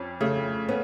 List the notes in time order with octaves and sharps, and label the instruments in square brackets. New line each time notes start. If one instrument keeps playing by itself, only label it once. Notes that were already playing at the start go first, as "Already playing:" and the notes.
Already playing: [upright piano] F2 C#4
[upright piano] C#3 [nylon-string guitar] A3
[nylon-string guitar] B3 [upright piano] C#4